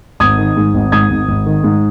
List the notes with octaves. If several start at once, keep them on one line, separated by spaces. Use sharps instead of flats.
G#1 D#6 G#6
D#3
G#2
G#1
G#2 D#6 G#6
G#1
G#1
D#3
G#2